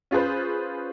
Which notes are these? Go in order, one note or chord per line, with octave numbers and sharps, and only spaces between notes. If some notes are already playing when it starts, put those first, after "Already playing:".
C#4 F4 G#4 B4 C5